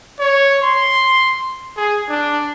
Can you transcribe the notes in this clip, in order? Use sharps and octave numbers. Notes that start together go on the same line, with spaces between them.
C#5
C6
G#4
D4